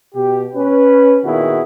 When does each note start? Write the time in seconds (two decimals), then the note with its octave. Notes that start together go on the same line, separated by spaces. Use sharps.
0.15 B2 G4
0.55 C#4 B4
1.24 A#2 D#3 B3 E4 F#4 G#4